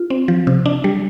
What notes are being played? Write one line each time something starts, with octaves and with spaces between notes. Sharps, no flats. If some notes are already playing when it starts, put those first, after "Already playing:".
Already playing: F4
C4
F3
C3
D4
G3